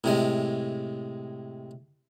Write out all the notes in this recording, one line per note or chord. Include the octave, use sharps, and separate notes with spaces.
A2 C3 G#3